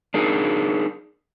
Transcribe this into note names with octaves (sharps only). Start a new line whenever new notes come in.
D4 D#4 G#4 A#4